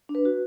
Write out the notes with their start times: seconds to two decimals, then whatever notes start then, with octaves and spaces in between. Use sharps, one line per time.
0.09 D4
0.15 B4
0.25 F#4